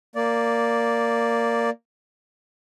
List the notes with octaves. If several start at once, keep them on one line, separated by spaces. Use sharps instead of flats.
A#3 D5